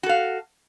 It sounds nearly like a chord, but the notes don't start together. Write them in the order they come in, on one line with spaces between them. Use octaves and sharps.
F#4 A4 F5